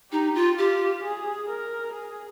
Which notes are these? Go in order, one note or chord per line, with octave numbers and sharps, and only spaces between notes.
D#4 G4
F4
F4 G4
G#4
A#4
G#4